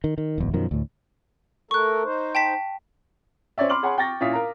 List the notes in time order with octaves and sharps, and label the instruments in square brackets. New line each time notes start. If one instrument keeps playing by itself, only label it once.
[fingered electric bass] D#3
D#3
D1 G#1 E2
F#2 B2 D#3 F3
D2 A2
[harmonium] A3 A4 A#4 [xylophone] C#6 F#6
[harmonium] D#4 C5
[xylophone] G5 A5 B6
[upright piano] C4 C#4 C#5 D5 E5
B5 C6 D6 F6 F#7
G#4 C#5 F#5 G#5 B5 C6
G5 C#6 A6 A#6
A#2 C#4 E4 F5 D#6 B6
A#4 F5 A#5